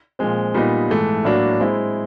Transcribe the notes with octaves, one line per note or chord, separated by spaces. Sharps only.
A#2 F3 G#3 C4
A#2 G3 B3 D#4
G#2 E3 A3
A2 F#3 A#3 D4 F#4
G#3 C4 E4